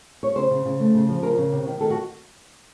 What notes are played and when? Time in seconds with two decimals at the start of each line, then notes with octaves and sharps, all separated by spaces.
0.23 C#5
0.36 C#3 C5
0.51 C#3
0.65 C#3
0.80 A3
0.95 C#3
1.09 F3
1.23 C#3 A#4
1.38 C#3
1.52 C3
1.67 D#3
1.81 D#3 A4
1.90 F#4